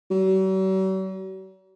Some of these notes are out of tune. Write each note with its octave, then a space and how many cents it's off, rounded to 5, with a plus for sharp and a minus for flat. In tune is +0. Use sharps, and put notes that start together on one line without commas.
F#3 +45